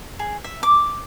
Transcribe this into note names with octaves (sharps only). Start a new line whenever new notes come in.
G#4
E5
D6